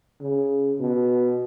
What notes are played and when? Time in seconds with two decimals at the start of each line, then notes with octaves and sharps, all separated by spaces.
0.21 C#3
0.79 B2